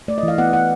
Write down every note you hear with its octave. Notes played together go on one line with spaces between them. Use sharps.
A3 D5
D#5
E3
F5
B3 F#5
B3 F#5